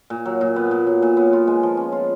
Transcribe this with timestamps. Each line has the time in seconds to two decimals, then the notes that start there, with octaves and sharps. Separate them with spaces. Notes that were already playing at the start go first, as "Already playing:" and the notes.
0.10 A#2
0.26 F#3
0.41 A#2
0.56 B3
0.71 A#2
0.87 F#3
1.02 A#2
1.17 B3
1.33 F4
1.47 G#3
1.63 F3
1.77 C#4
1.92 F4